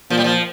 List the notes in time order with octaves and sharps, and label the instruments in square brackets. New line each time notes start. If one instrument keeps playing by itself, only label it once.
[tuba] A#2 [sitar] F3
[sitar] G3
F3